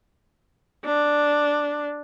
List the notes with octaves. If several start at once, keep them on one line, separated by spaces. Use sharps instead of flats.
D4